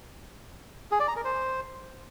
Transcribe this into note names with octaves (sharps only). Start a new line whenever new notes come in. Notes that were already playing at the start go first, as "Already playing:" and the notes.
G#4
D5
A#5
A#4
C5